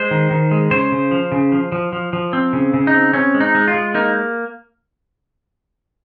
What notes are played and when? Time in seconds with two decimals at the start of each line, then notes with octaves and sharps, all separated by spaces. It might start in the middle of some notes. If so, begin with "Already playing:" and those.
Already playing: G#3 C5
0.11 D#3
0.31 D#3
0.51 G#3
0.71 C#3 C5
0.92 C#3
1.11 F3
1.32 C#3
1.52 F3
1.72 F3
1.93 F3
2.13 F3
2.33 C4
2.53 C#3
2.74 C#3
2.87 D#4
2.94 C4
3.14 C4 C#4
3.34 G#3
3.40 D#4
3.55 G#3
3.68 F4
3.74 G#3
3.94 A#3 D#4